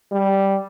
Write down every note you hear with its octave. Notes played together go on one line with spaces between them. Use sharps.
G3